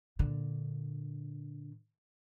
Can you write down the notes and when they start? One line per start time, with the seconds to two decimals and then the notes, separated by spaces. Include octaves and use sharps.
0.19 A#2 D3